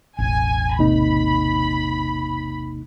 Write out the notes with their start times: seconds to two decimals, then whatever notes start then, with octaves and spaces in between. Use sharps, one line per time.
0.19 E1 A1 G#5
0.79 C3 A#3 D#4 B5